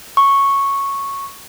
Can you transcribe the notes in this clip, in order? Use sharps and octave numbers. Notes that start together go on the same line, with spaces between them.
C#6